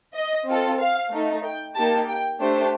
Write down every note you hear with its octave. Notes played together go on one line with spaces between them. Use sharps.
D#5
C4 F4 A4
F5
A3 D#4 A4
G5
A#3 D#4 G4 A5
G5
A3 D4 G4 C5